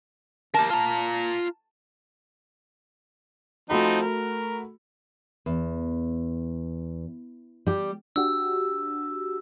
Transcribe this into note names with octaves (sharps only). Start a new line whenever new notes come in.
G4 A#4 A5
F4 A#5
F3 A3 C4 D#4 F#4 B5
A#4
E2
G3 G4
D4 F#4 G4 E6